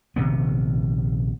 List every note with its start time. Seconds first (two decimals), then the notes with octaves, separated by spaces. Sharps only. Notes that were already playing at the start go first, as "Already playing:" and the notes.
0.16 A#1 C3 D#3 B3